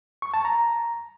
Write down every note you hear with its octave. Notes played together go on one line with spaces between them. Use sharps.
C#6
A5
A#5